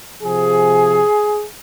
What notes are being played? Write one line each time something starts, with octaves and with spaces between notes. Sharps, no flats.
C3 F3 G#4